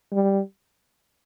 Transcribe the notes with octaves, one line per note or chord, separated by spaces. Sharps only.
G3